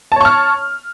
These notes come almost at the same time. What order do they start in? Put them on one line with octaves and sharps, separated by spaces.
A5 C#5 C#6 F6